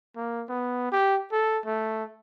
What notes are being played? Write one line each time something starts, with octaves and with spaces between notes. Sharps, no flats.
A#3
B3
G4
A4
A3